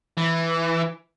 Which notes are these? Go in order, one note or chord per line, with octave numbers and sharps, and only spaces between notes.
E3